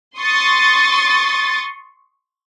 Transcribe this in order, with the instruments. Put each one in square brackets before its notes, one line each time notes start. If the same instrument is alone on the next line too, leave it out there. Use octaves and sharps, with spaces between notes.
[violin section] C6 C#6 D#6 A6